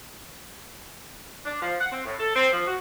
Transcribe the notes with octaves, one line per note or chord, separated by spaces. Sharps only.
D4
F3
F#5
C4
A2
A4
C4
F3
F#4